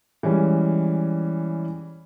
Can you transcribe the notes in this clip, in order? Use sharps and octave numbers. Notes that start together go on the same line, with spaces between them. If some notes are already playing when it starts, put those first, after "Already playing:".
E3 G3 G#3 C#4